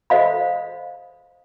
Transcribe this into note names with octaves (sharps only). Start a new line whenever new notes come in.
A4 C5 D#5 F5 B5